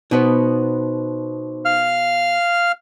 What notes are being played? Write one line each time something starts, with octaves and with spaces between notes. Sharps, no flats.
B2 B3 D#4 C5
F5 F6